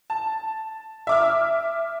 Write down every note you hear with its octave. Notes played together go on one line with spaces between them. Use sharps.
A5
E5 D6 F6